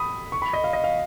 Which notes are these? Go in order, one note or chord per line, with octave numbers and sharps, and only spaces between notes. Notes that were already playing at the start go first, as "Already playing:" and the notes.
Already playing: B5 D#6
C#6
B5
D#5
F5
D#5
F5